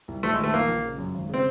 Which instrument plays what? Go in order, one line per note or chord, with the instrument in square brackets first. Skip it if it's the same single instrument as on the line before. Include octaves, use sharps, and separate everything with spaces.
[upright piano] C2
[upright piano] A#1 [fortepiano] A3
[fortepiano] G#3
[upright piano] D#3
[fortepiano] A3
[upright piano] A#1 [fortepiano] A#3
[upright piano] A#1
C#3
F#2
G#1
[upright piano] C#3 [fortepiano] C4